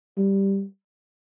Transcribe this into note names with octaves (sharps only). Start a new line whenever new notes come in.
G3